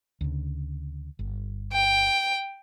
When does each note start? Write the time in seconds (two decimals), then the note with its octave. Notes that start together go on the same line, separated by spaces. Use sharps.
0.21 D2 C#3
1.19 G1
1.73 G5